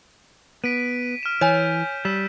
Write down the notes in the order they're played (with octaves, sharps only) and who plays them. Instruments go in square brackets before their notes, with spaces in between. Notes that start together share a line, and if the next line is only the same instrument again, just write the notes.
[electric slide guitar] B3 [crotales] B6 D7 D#7
[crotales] F6 E7
[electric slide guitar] E3 [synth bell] C#5 G#5 [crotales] G6
[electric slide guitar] G3 [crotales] E6 B6 E7